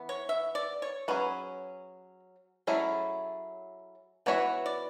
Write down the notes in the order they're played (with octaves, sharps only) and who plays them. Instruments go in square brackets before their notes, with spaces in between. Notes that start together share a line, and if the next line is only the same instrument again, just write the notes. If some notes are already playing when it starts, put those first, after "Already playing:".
Already playing: [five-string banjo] E3 B3
[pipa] C#5
E5
D5
C#5
[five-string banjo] F#3 C#4 G#4 [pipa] B4
[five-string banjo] F#3 A3 C#4 E4 G#4 [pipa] A4
[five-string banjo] E3 B3 F#4 C#5 E5 [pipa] B4
[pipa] D5